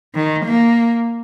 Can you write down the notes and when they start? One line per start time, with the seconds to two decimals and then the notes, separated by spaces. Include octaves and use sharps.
0.15 D#3
0.45 A#3